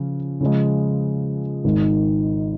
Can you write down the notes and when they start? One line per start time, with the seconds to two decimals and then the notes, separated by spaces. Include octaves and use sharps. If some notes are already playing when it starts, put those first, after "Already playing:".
Already playing: C#3 F3 C#4
0.41 C#3 F3 G#3
1.64 G#1 G#2 D#3